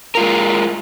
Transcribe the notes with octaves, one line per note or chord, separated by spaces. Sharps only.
G#3 F4 A#4